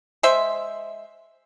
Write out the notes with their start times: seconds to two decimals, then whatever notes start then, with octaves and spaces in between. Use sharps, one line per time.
0.23 G#3 C5 E5